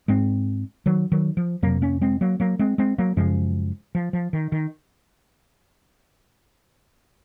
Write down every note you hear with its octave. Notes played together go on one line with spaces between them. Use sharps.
G#2 G#3 C4
D#3 F#3
D#3 F#3
F3
F2 C3 F#3 A#3
A#3 C#4
G#3 C4
F#3 A#3
F#3 A#3
G#3 C4
G#3 C4
F#3 A#3
F#2 C#3 F3 G#3
F3
F3
D#3
D#3